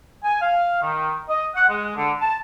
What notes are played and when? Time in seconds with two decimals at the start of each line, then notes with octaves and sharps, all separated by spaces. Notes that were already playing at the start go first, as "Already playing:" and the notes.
0.24 G#5
0.42 F5
0.82 D#3
1.29 D#5
1.55 F#5
1.69 G#3
1.96 D3
2.20 A5